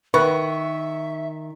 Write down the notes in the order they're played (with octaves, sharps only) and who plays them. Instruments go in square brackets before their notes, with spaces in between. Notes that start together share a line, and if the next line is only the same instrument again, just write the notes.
[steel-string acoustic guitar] D#3 [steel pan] B4 [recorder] E5 [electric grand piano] C#6